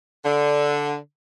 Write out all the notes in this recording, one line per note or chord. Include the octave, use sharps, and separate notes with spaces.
D3